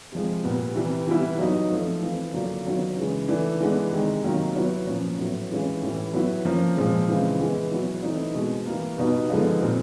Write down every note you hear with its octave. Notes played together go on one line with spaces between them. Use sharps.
C3 F3 G#3
A#2 G3 B3
C3 E3 G3
E3 G3 B3 E4
F#3 B3 D#4
F3 A3 C4
E3 A3 C4 F4
D3 F#3 A#3 D4 F4
D#3 F#3 B3 D4 F4
C#3 E3 G#3
E3 A3 D4
E3 G#3 B3 D4
C3 D#3 G#3
C3 D#3 F#3 A#3
F#3 B3 E4
A#2 F3 A#3 C#4
A2 F#3 B3
C3 E3 G#3 C#4 F4
A2 E3 G3
F#3 B3 E4
F3 A#3 C#4
A#2 F3 G#3
C#3 E3 G#3 C4 F4
E3 G#3 B3
B2 F#3 B3 E4
E3 A3 C4 D#4
B2 G#3 C4
E3 G3 A#3
B2 G3 B3 D#4
D3 F3 G#3 B3 D#4
A#2 G3 C4